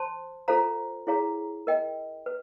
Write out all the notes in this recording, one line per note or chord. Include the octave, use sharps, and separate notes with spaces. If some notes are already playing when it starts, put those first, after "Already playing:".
Already playing: C5 A5 C6
F4 A4 C5 F5 A#5
E4 G#4 C#5 F5 A#5
A#4 D#5 G5
B4